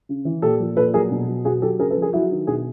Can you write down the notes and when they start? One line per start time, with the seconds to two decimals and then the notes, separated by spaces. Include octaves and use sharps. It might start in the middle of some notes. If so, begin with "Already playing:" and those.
0.09 C#3
0.25 E3
0.42 A#2 G4 A4
0.60 F3
0.77 A#2 A4 B4
0.94 F#3 G#4 A#4
1.11 B2
1.28 F#3
1.45 B2 F#4 G#4
1.62 F#3 G4 A4
1.79 C#3 G#4 A#4
1.90 A4 B4
1.96 F3
2.02 G#4 A#4
2.13 F#3 E4 F#4
2.31 D#3
2.47 B2 F#4 G#4